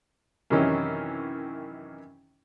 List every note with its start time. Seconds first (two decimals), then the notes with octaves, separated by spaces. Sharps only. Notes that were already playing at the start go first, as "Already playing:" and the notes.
0.50 F#2 C3 D#3 E3 C#4 D#4